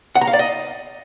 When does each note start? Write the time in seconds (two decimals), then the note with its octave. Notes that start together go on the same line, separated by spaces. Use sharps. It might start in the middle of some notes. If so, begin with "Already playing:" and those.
0.15 F#5
0.21 A#5
0.27 F5
0.33 D5
0.39 D#5